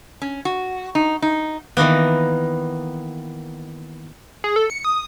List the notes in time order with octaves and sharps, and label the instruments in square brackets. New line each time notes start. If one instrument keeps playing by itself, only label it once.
[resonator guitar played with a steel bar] C#4
F#4
D#4
D#4
[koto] D#3 E3 A#3 B3
[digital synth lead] G#4
A4
C#7
D#6